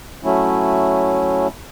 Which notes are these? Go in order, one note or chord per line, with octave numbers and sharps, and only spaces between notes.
F#3 A3 C#4 E4